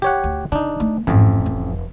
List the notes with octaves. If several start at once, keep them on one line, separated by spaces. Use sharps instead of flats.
G4 C#5 F#5
D2
C#3 D4 D#4
A3
A1 F2 G#2 C4
F1